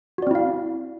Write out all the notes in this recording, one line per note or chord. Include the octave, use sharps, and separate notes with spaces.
C4 E4 F#4 D5 F5